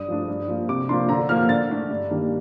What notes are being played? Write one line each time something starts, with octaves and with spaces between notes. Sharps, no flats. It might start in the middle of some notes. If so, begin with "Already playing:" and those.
Already playing: G2 D#6
F3 A3 D4
G2
F3 A#3
C3 D6
F3 A#3 D4 C6
D3 A#5
F3 A#3 F6
D3 A6
A3 D4
G2
D#3 G3 A#3 D4